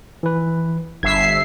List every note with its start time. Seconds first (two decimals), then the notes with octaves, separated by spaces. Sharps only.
0.23 E3 B4
1.03 G1 E5 G#6 C7